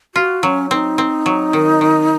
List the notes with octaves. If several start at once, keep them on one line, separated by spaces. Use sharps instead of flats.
F4 F#4
F#3 C#4
C4 D#4
C4
F#3
D#3
D#3